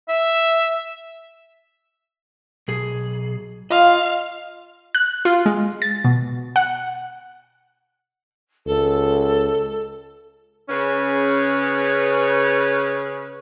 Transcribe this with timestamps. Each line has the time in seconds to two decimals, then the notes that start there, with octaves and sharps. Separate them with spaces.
0.09 E5
2.68 B1 G#4
3.71 F4 D#5 F5
4.95 F#6
5.25 F4
5.46 G#3
5.82 A6
6.05 B2
6.56 F#5
8.66 C#2 A4
10.69 C#3 C#4 G#4 B4